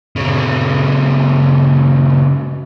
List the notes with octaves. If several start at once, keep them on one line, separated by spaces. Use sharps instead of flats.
A#2 C#3